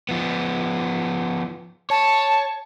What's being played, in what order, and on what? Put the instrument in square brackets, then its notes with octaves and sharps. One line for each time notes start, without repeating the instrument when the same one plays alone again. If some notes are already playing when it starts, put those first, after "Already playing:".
[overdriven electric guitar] F3 B3
[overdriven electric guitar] C#5 [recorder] A5